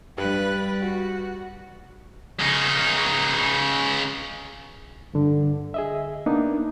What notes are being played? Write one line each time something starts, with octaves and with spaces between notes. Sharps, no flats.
G2 G3 B4 F#6
F#4
C#3 D#4
G2 D3
G#4 D#5 E5
A#3 B3 D4 D#4